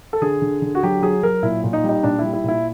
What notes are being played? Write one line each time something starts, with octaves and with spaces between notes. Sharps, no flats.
A4
D3 G#4
D3
D3
F#4
F#3 G4
F#3 G#4
F#3 A#4
A#2 E4
A#2
D#4
G3
D#4
A#2 D4
G3 E4
E4
A#2 E4